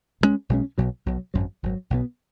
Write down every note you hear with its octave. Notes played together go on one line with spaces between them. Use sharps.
B1 B2 G#3 C#4
B1 B2 G#3 C#4
B1 B2 F#3
B1 B2 F#3
G#1 F#2 F#3
G#1 F#2 F#3
B1 B2 B3